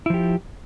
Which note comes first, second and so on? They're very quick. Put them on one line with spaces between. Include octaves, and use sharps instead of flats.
E4 F3 G4